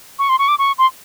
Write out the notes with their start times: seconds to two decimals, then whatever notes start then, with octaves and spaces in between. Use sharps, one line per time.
0.19 C#6
0.29 C6
0.39 C#6
0.48 D6
0.59 C#6
0.78 C6